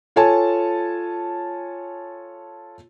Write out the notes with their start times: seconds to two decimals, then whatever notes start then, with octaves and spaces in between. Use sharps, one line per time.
0.16 F4 A4 C#5 G#5 A5